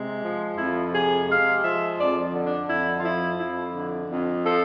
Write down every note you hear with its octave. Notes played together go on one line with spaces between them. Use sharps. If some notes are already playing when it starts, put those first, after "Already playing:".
Already playing: C3 G#3
F3
F2 E4
C3 G#4
G#3 F5
F3 E5
F2 D5
D3
D4
F2 E4
F4
F3 E4
F2 E4
D3
F2
F3 A4